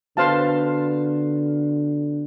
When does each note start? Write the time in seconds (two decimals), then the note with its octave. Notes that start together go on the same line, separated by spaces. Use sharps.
0.17 D3 B3 F#4 B4 C5 F5 A5